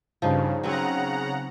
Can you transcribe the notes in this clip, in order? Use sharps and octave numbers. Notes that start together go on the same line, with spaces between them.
G2 C#3 F3 D#4
C#3 F#3 B3 C4 F#5 A#5